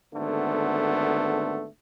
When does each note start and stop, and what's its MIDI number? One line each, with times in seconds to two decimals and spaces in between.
0.14 1.66 32
0.14 1.66 50
0.14 1.66 57
0.14 1.66 59